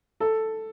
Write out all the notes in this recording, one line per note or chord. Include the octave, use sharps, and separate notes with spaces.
A4